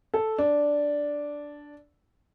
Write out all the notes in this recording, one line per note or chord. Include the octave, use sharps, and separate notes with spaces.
A4
D4